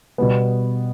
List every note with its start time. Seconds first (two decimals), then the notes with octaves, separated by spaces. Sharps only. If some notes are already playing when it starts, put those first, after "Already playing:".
0.18 B2 G3 B3